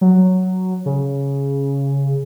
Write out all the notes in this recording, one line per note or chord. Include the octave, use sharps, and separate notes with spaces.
F#3
C#3